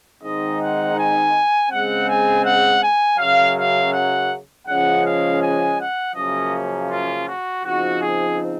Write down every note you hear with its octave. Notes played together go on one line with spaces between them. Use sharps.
G#2 D#3 G#3 C4 D#4 D#5
F#5
G#5
C#3 G#3 C4 F#5
G#5
F#5
G#5
F#2 C#3 F#3 F5
F5
F#5
C#3 F3 G#3 C#4 F#5
F5
G#5
F#5
F#2 C#3 F3 A#3 C#4 D#5
F4
F#4
C#3 F3 C4 D#4 F#4
G#4